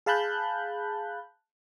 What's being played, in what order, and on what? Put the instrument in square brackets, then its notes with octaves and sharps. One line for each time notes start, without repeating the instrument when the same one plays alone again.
[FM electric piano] G#4 F5 A5 B5 F#6 G6